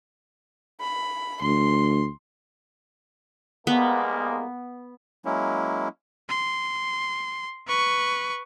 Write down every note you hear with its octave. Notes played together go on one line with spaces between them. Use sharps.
B5
D2 C6
C2 G#3 A#3 B3
F#3 G#3 A#3 C#4 E4
C6
B4 C#6